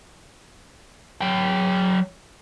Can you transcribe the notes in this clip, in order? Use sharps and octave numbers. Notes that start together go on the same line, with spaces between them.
F#3 G5